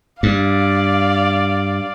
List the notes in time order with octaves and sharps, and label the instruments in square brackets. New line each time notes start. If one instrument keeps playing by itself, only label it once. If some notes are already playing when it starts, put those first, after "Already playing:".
[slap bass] G2 [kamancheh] D5 F5